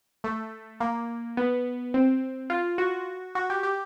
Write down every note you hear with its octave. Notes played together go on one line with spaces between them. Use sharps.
A3
A#3
B3
C4
F4
F#4
F#4
G4
G4